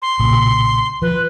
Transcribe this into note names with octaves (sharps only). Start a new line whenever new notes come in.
C6
B1 A#2 C#3
F3 B4